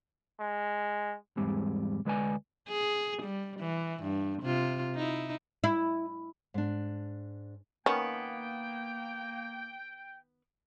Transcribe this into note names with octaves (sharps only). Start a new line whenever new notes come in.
G#3
E2 G#2 G3 G#3 C4
D2 G#3 B4 D5 G#5
G#4
G3
E3
G2
C3 F4
D#4 E4
E4
G#2 D4
D#3 A#3 B3 C#4 G5